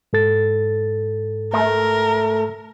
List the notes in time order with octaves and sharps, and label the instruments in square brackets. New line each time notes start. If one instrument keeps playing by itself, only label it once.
[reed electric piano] G#2 A4 A6
[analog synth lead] A3 [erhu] A#4